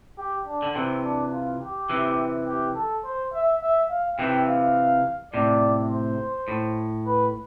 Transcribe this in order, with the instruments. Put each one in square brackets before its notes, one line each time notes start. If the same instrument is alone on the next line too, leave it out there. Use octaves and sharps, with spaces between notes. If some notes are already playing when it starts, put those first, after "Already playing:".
[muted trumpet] G4
D4
[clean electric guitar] D3
[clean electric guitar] C3 E3 [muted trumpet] C4
[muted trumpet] D4
F4
G4
[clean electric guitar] C3 E3
[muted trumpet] G4
A4
C5
E5
E5
F5
[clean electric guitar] C3 E3 [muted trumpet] G5
[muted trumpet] F5
[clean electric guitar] A2 C3 [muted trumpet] D5
[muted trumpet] C5
[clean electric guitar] A2
[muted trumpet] B4